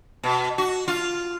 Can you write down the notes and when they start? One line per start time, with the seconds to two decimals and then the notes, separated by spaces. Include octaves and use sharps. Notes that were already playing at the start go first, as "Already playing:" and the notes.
0.23 B2
0.58 F#4
0.88 F4